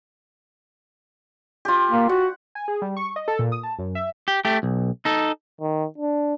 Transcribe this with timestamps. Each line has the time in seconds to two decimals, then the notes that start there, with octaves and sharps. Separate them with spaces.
1.65 F4 G4
1.91 A#3
2.09 F#4 F#5
2.55 G#5
2.68 G#4
2.82 G3
2.97 C#6
3.16 D#5
3.28 A4
3.39 A#2
3.52 D#6
3.63 A5
3.79 F#2
3.95 E5
4.28 G4
4.45 A3 G4
4.63 B1
5.05 D#4 A4
5.61 D#3
5.98 D4